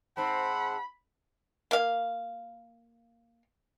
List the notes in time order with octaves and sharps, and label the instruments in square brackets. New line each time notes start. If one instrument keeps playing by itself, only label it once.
[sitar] G#2 C4 [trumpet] F#5 [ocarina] A5 [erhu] B5
[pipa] A#3 F5